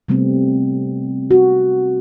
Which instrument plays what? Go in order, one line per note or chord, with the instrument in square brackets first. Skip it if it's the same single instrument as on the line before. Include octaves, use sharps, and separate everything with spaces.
[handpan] C3 G3 A3 B3 C4
F#4